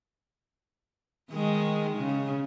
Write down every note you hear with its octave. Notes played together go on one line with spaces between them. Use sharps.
D#3 G#3
C#3